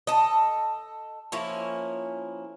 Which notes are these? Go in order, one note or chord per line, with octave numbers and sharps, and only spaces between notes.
A4 D#5
F3 A#3 C#4 E4